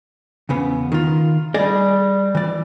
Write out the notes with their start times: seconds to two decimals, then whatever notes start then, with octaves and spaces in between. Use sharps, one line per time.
0.49 E2 C#3 B3
0.92 D#3 F4
1.54 G3 G#4 D5 D#5
2.35 E3 D5